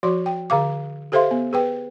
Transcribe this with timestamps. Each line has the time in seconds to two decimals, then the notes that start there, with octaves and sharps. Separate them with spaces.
0.03 F3 F#4 D5 C6
0.26 G5
0.50 D3 G#4 F5 D6
1.12 G4 A4 C5 E5 F5 C6
1.31 B3
1.53 G#4 B4 G5